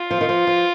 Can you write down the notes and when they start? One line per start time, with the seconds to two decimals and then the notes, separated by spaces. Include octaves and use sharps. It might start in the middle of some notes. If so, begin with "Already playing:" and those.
Already playing: F4
0.11 F3
0.21 D#3
0.29 F3
0.47 F3